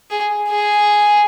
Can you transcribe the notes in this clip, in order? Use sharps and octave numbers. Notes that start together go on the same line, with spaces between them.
G#4
G#4